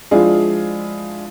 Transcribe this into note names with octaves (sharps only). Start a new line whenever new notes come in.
F3 G#3 D4 E4 F4 G#4